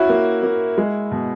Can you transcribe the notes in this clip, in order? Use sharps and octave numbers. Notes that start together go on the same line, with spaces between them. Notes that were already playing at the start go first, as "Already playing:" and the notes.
Already playing: C#4 E4 F#4
A#3
A#3
G#3
B2